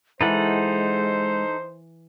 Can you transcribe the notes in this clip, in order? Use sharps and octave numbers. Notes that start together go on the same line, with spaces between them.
E3 G#3 D#4 A4 C5 F#5